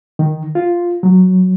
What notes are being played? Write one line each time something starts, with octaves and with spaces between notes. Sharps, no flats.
D#3
F4
F#3